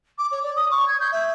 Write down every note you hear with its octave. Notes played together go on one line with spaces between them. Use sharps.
D6
C#5
D5
D#6
C#6
G#6
G6
E5